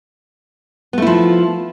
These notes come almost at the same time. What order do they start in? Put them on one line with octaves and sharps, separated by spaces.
B3 A3 E4 F3